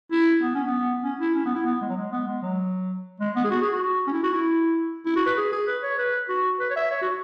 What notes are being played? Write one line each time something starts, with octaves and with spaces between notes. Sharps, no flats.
E4
B3
C#4
B3
C#4
E4
C#4
B3
E4
B3
G#3
F#3
G#3
B3
G#3
F#3
G#3
B3
G#4
F#4
G#4
F#4
C#4
E4
F#4
E4
E4
F#4
B4
G#4
G#4
B4
C#5
B4
F#4
B4
C#5
E5
C#5
F#4